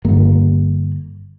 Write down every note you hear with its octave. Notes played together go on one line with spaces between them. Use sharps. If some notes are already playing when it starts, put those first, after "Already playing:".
G1 A#3